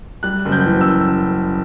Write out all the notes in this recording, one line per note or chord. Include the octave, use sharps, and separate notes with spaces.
G3 F#6
F#1
G6
E3
E6